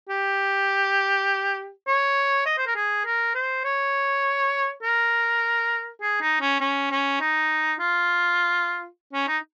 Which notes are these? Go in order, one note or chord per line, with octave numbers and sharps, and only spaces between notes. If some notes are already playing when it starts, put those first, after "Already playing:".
G4
C#5
D#5
C5
A#4
G#4
A#4
C5
C#5
A#4
G#4
D#4
C#4
C#4
C#4
D#4
F4
C#4
D#4